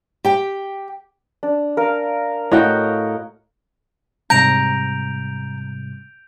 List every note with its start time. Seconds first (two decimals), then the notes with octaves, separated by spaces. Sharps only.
0.25 G4 G5
1.43 D4
1.77 A#4 F5
2.52 A2 F#4 C#5 D#5 F5 G5
4.30 G#2 C3 G3 A#5 G6 D7 F7